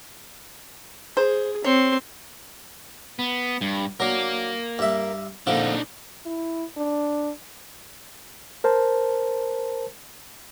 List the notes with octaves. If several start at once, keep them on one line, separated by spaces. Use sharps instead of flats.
G#4 C5
C4 C#5 C6
B3
G2
F#3 D4 A#4 F5
G2 E5
A#1 D3 F3 D4 D#4
E4
D4
A#4 C5 A5